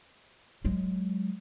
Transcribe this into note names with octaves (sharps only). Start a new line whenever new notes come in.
F#3 G#3